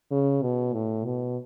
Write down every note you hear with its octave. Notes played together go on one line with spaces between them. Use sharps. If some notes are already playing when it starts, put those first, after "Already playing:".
C#3
B2
A2
B2